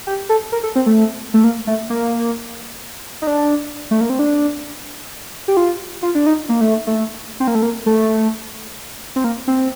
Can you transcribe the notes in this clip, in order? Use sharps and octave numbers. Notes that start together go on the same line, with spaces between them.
G4
A4
A#4
A4
C4
A3
A3
A#3
A3
A#3
D#4
D4
A3
A#3
C4
D4
G4
F4
F4
D4
D#4
A#3
A3
A3
C4
A#3
A3
A#3
A3
C4
A#3
C4